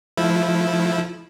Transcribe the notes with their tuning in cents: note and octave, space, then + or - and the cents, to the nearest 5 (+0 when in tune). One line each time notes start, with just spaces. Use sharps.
F3 +0 A3 -40 E4 -5